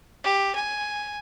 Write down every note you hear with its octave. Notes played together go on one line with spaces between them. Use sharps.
G4
G#5